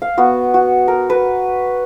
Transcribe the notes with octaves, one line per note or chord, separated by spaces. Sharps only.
F5
B3 F#4
F#4
A#4
B4